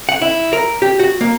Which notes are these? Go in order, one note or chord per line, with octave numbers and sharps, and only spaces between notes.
F#5
E4
A#4
G4
F#4
A#3